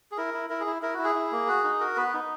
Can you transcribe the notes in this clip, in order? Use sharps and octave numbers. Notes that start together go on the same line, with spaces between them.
G#4
E4 A#4
E4
E4 A#4
G#4
E4
E4 A#4
E4 F#4
G#4
E4
A#3
F#4
D#4
F#4 A#4
B3 B4
D#4